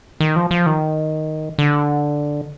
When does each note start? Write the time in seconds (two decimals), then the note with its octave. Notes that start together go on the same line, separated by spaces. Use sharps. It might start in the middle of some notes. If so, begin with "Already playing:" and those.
0.20 D#3
0.36 F3
0.51 F3
0.66 D#3
1.59 D3